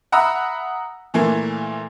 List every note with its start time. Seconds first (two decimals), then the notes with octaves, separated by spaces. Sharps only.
0.12 E5 F#5 A#5 B5 D#6 E6
1.14 A#2 E3 A3 A#3